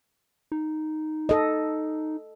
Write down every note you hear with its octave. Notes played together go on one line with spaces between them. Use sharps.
D#4
A4 D#5